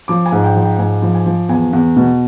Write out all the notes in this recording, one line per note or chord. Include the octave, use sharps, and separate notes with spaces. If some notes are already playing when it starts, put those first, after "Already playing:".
F3 D6
G#5
G#2
G5
F3
G5
G#2 G#5
F3
G#5
F3
E2 G#5
E2
B2